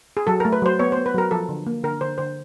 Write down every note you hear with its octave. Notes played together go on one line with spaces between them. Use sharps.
G#4
F#3 A4
A#4
A3
B4
F#3 C5
B3 C#5
C5
B3
B4
F#3 A#4
F3 A4
D3
A#3
D3 A#4
D3 C5
D3 C5